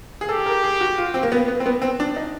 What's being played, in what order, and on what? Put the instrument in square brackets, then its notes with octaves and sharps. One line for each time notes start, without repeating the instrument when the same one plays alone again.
[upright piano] G#4
[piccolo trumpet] G4 [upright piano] A4
[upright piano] A#4
G#4
F#4
F4
C4
A#3
B3
B3
C4
B3
C4
D4
D#4